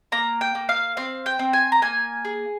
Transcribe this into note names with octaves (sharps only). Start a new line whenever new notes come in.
A#3 A#5
G5
A#3
F5
C4 F5
G5
C4
G#5
A#5
A#3 G#5
G#4